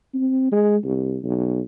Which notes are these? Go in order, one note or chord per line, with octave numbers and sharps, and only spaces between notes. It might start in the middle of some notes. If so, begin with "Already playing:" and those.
C4
G#3
C2
B1